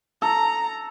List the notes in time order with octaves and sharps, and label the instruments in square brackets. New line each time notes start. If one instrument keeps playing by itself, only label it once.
[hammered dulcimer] A4 [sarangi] A#5